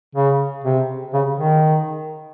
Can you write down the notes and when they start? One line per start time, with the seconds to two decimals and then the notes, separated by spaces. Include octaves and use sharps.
0.15 C#3
0.64 C3
1.14 C#3
1.38 D#3